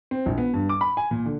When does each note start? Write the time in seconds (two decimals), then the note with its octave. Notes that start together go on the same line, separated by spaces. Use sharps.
0.11 C4
0.26 A#1
0.38 B3
0.54 G2
0.69 D6
0.81 B5
0.97 G#5
1.11 A#2
1.26 D3